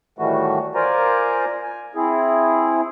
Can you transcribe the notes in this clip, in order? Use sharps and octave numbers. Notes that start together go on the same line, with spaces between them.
A2 D#3 E3 G3 A3 F#4
F4 A#4 C5 D5 G#5 A#5
G#5
C4 E4 G#4